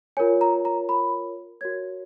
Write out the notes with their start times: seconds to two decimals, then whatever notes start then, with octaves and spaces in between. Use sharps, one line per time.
0.17 F4 A#4 C#5 G#5
0.41 A#5
0.65 A#5
0.89 B5
1.61 F#4 A#4 C#5 G#6